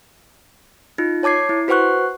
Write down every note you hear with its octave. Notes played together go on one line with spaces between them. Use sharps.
D#4 F4
C#5 A5 D6 G#6 C7
E4
F#4 B4 C5 F#5 C#6 F#6